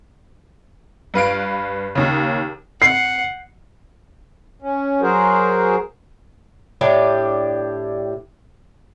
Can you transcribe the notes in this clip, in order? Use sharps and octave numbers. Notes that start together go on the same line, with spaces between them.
G2 B4 F5 D7
D#2 C#3
F#5 C7
C#4
F#3 F#4 G#4 A#4 C5
A2 D4 G4 D5